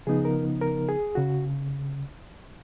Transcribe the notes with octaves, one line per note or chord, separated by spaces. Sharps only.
C#3 F3 B3 D#4 G#4
A#4
A#4
G#4
C#3 F#4